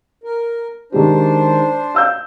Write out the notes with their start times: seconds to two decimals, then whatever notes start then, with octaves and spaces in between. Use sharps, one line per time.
0.24 A#4
0.92 D#3 G#3 D4 G4 C5
1.95 F5 E6 G6